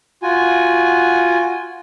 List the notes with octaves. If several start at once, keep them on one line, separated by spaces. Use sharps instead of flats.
F4 F#4 G#5